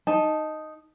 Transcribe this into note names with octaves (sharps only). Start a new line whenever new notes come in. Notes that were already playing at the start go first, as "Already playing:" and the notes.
D#4 A5